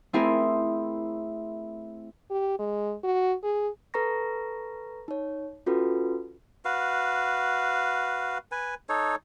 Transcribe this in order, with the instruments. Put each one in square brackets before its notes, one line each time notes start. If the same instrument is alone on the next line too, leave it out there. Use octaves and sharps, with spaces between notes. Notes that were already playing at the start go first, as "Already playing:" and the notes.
[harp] A3 C4 E4 G#4 A#4
[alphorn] G4
G#3
F#4
G#4
[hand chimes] A4 B4 A#5 C#6 A#6
D#4 C#5
C#4 F4 F#4 A4 B4
[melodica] F#4 B4 F5
B4 G#5
D#4 A4 C#5